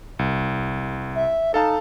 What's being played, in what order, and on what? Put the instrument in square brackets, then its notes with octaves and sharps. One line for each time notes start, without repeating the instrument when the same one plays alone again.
[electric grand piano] C2
[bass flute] E5
[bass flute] D#4 [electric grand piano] A4 F5 A5